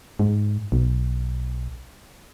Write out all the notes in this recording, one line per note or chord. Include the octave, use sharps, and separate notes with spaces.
G#2
B1